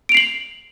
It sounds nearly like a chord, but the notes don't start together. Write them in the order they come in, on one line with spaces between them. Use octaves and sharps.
D7 F7 C7 F#7